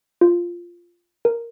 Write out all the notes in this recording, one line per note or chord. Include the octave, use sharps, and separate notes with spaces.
F4
A#4